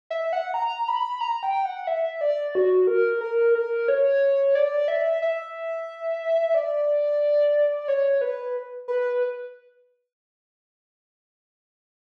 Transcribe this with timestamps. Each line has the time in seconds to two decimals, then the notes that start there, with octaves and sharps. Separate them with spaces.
0.10 E5
0.33 F#5
0.54 A#5
0.88 B5
1.21 A#5
1.43 G5
1.65 F#5
1.87 E5
2.21 D5
2.55 F#4
2.87 A#4
3.21 A#4
3.55 A#4
3.88 C#5
4.55 D5
4.88 E5
5.22 E5
6.55 D5
7.88 C#5
8.21 B4
8.88 B4